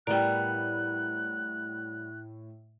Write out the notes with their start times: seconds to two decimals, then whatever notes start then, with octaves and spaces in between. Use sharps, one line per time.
0.07 A2 G3 B3 A#4 D5 G5 F#6